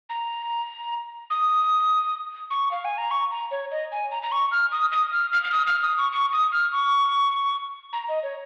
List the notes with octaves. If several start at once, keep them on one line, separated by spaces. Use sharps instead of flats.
A#5
D#6
C#6
F5
G#5
A#5
C#6
A#5
C#5
D#5
G#5
A#5
A#5
C#6
F6
D#6
D#6
F6
F6
F6
D#6
F6
D#6
C#6
C#6
D#6
F6
C#6
A#5
D#5
C#5